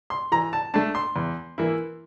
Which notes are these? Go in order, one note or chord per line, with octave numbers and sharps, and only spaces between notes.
C6
E3 A#5
A5
A3 D4 A5
C6
E2
E3 A#3 E4